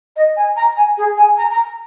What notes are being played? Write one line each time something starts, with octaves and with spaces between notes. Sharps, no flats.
D#5
G#5
A#5
G#5
G#4
G#5
A#5
A#5